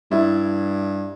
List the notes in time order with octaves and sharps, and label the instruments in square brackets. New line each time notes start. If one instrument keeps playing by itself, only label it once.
[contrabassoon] G2 [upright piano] E4